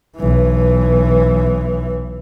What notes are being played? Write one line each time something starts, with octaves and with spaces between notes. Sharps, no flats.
B1 E3